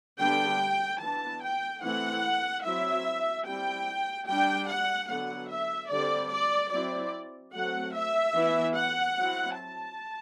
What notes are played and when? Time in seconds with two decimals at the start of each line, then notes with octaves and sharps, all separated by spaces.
0.19 D3 G3 B3 D4 G5
1.01 E3 B3 D4 A5
1.42 G5
1.82 E3 A3 C4 E4 F#5
2.64 F#3 C4 E4 E5
3.46 G3 C4 E4 G5
4.27 G3 D4 G5
4.67 F#5
5.08 D3 F#3 B3 F#5
5.49 E5
5.90 D3 G3 C4 D5
6.31 D5
6.71 F#3 C4 E4 D5
7.53 F#3 A3 C4 F#5
7.94 E5
8.34 E3 B3 E4
8.75 F#5
9.16 F#3 C4 E4
9.57 A5